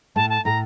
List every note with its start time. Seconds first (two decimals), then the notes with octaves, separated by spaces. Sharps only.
0.16 A2 A3 A5
0.30 A5
0.45 A2 A3 A#5